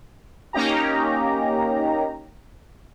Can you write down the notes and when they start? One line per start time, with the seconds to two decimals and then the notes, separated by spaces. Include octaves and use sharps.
0.53 A#3 C#4 D#4 G4 A#5